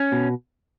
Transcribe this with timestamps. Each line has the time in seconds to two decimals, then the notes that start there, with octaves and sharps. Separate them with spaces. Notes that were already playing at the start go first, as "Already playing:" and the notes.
Already playing: C#4
0.12 B2